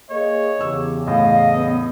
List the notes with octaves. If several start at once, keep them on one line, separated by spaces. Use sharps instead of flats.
A#3 G#4 C#5 D#5
E2 C#3 G4 E6
A2 D#5 F5
B3